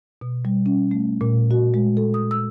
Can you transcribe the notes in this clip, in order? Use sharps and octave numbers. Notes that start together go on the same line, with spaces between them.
B2
G3
C#4
A3
A#2
F#4
G#3
A4
D#6
E6